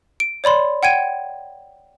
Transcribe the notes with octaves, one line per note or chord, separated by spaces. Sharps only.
D7
C#5 D5 B5 C6
F#5 G5 G#6 D#7